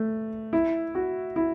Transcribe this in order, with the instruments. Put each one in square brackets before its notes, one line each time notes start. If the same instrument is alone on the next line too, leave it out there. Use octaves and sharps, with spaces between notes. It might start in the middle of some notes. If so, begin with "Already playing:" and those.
Already playing: [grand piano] A3
E4
F#4
E4